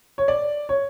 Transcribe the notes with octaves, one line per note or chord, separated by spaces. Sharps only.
C#5
D5
C#5